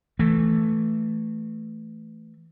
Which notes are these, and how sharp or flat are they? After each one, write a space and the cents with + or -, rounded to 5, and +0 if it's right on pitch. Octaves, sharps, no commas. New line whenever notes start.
E3 +0 A3 +0